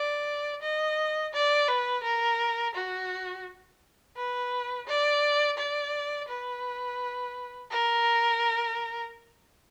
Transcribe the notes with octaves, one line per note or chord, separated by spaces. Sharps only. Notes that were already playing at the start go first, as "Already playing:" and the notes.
Already playing: D5
D#5
D5
B4
A#4
F#4
B4
D5
D5
B4
A#4